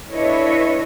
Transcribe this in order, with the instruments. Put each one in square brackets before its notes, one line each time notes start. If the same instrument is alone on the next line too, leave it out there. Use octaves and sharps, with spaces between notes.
[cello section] D4 E4 A4 B4 C#5 D#5